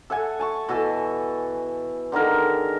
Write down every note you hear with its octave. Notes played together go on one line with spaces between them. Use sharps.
A4 E5 F#5 G#5
G#5 A5 C#6
B2 E3 A4 G#5
D3 D#3 G#4 A#4